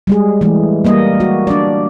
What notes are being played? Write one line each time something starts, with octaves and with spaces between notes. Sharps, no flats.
G3 G#3 G#4
E3 G#3 A3
G3 A#3 D#5
F#4
D4 D5